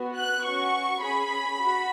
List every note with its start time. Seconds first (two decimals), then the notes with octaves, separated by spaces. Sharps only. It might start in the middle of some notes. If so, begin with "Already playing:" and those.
Already playing: B3 F#4
0.17 F#6
0.45 C#4 F#4 C#6
1.02 C#4 G#4 B5
1.59 F#4